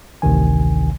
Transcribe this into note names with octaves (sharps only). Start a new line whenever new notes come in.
A1 D2 C3 D#3 G#5